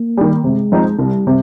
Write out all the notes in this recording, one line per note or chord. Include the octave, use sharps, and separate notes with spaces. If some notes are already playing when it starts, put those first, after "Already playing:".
Already playing: A#3
D#3 G3
C3 G#3
F3 C4 D#4
C2 G3
C3